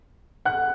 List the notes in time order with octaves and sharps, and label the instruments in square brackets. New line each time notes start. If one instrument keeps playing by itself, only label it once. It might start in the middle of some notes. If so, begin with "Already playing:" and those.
[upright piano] F#5 F#6